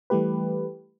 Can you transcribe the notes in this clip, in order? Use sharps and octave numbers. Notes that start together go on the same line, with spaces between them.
E3 G3 A3 G4 B4